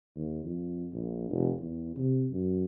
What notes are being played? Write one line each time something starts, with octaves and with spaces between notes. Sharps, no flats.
D#2
F2
A#1
F1
E2
C3
F#2